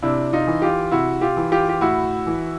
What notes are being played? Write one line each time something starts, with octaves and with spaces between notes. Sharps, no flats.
C3 D4 E4
D#4 F4
E3
F4 G4
C3 E4 F#4
F4 G4
E3
F4 G4
G4
A2 E4 F#4
E3